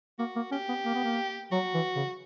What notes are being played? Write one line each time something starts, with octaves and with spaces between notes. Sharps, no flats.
A#3 F#4
A#3
C#4 G4
B3
A#3
B3
A#3
F#3 F#4
E3
C#3